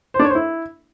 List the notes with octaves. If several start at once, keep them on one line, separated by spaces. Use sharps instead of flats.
C5
D4
C#5
C5
E4